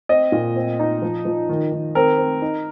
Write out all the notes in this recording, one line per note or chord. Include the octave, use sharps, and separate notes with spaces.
C4 D#5
A#2
C4
D#4
F3
F3
D#3
D#3
C4 A#4
C4
D#4